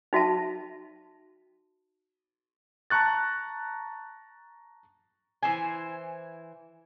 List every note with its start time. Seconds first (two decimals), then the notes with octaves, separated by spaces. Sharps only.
0.13 D#4 F#4 E5 A5
2.90 A5 A#5 C#6 F#6 A6
5.43 E3 C5 G#5